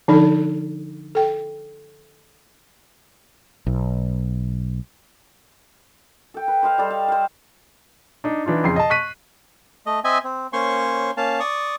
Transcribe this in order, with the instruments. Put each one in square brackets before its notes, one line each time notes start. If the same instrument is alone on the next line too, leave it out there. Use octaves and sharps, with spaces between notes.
[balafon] D3 F3 D4 D#4 A4 D5
A4 G5
[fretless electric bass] B1
[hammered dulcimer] A4 G5
B4
C5 D#5 F5
G3 A4 C5
F5
C5 F5
[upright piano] D4 D#4
E3 D4 D#4 F4
F2 C#3 G5 C6 C7
D#5 A5
C#6 F#6 B6 D#7
[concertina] A3 D#5
C4 D#5 E5 G#5
C4
A#3 C#4 C5 C#5 C6 C#6
A#3 C#4 F5 A5
D5 C#6 D#6